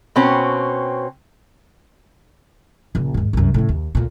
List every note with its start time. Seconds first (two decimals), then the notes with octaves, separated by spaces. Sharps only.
0.16 B2 C4 C#4
2.95 A#1 C#3
3.14 D#2 G#2
3.33 C2 F#2
3.54 A2 C#3
3.69 D#2
3.95 D2 A#2